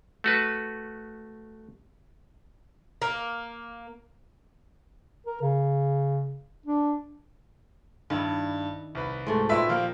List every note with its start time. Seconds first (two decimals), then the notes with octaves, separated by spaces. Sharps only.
0.24 A3 F#4 B4
3.02 A#3
5.27 A#4
5.42 C#3
6.66 D4
8.10 G2 D#3 D4 E4
8.95 C2 B4
9.27 G#2 A3 F#4
9.49 A#2 A#3 C4 B4 E5
9.69 F3 A#3 G4 A#4